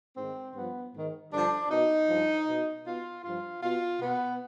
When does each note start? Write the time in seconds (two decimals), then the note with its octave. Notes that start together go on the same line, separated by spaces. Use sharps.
0.16 G#2 D#3 C4
0.55 G2 F3 B3
0.94 G#2 D#3
1.32 G2 D3 F3 D4
1.70 B2 D#4
2.09 G2 F3
2.48 B2
2.86 B2 F4
3.24 G2 F3 F4
3.63 B2 F4
4.01 B2 B3